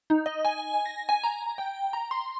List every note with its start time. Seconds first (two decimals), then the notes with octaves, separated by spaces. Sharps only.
0.10 D#4
0.26 D#5
0.45 G#5
0.86 A#6
1.09 G#5
1.24 A#5
1.58 G5
1.93 A#5
2.11 C6